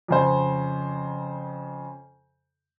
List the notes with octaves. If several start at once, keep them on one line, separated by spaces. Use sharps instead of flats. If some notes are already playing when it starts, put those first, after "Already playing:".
F2 C#3 C5